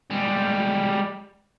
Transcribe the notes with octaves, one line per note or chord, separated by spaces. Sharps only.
G3 G#3